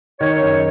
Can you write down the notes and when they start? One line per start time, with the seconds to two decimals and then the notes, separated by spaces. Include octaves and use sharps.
0.20 D#3 C#5
0.42 F#1